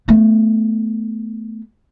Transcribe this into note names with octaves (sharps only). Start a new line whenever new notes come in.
A3 B3